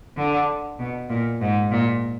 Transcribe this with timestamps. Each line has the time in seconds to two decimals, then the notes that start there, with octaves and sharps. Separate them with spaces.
0.17 D3
0.79 B2
1.10 A#2
1.42 G#2
1.72 A#2